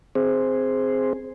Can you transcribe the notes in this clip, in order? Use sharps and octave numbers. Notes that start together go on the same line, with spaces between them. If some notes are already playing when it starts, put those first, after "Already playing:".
C4 G#4 C5